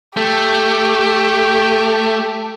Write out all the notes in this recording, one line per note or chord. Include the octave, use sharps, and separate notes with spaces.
A3 G4